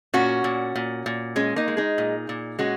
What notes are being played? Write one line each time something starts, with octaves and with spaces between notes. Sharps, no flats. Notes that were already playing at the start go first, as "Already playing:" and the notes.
A#2 C#4 F#4
A#2
A#2
A#2
G#3 C#4
A#3 D#4
G#3
D#4 G#4
A#2
A#2
G#3 C#4 F#4